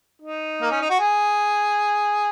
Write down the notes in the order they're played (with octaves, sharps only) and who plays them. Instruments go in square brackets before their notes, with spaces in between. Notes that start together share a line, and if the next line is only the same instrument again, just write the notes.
[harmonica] D#4
A#3
C#4
D#4
F#4
G#4